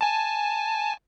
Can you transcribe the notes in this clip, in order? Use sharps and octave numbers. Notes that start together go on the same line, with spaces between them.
G#5 A5